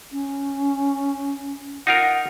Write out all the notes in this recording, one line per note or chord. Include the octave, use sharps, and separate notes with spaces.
C#4
D#4 F4 A#4 F#5